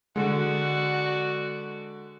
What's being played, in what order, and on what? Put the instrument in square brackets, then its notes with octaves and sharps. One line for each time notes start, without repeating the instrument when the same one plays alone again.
[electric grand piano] D3 G#3 [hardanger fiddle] F#4 D5